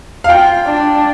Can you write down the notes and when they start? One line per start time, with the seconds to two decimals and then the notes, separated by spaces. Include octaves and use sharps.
0.24 F5
0.29 F4 G5
0.66 D4